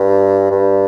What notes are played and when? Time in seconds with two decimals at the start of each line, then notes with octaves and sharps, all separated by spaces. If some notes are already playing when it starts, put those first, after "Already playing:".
Already playing: G2
0.51 G2